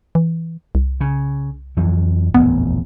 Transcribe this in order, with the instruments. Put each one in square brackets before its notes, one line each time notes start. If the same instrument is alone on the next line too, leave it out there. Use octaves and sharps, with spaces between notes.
[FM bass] E3
C2
[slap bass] C#3
F2 E3 F#3
[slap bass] D#1 A1 F2 [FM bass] B3